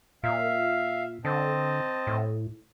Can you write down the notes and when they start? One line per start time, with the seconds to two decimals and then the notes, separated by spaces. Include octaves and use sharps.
0.23 A#2 E5 F5
1.25 D3 C4 D#5 A5
2.07 A2